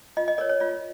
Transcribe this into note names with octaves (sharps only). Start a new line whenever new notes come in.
F4 D#5
D#5
A#4 C#5 D5
C#5
F4 D5